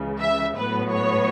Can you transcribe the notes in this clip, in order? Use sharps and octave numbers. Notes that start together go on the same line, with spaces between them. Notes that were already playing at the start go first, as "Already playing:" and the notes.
Already playing: C#2 C#3 E3
E5
A2 F#3 B3 B4
C#5